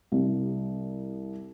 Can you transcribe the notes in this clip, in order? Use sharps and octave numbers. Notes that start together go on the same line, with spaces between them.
C2